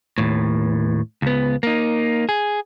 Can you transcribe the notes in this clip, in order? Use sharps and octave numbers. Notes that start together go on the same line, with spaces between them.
D#2 A2
C#2 B3
A#3 D#4
G#4